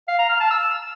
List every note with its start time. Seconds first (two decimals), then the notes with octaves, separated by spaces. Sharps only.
0.08 F5
0.19 A#5
0.29 F6
0.40 A5
0.51 E6